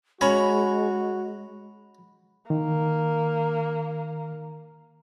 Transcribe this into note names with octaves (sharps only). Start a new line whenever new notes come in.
G#3 C#4 F#4 C#5 A#5 B5
D#3 A#3